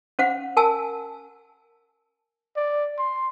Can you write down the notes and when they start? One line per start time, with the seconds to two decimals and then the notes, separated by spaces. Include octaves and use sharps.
0.19 C#4 C5 F5 F#5
0.57 A#4 G#5 A5 E6
2.56 D5
2.98 C6